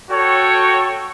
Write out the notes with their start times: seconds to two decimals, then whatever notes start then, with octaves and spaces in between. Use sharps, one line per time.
0.10 F#4 A4 C#5 G5 C#6